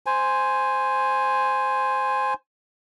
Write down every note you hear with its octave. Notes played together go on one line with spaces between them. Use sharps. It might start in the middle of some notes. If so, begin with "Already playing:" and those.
C5 G#5